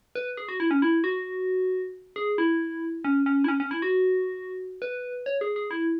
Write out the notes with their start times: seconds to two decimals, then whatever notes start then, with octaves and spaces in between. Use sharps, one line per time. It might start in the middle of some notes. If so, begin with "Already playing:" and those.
0.15 B4
0.37 G#4
0.49 F#4
0.60 E4
0.71 C#4
0.82 E4
1.04 F#4
2.16 G#4
2.38 E4
3.04 C#4
3.26 C#4
3.44 E4
3.48 C#4
3.60 C#4
3.71 E4
3.82 F#4
4.82 B4
5.26 C#5
5.41 G#4
5.56 G#4
5.71 E4